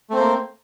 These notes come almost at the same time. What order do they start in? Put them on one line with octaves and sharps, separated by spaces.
A3 C4 C5 A#3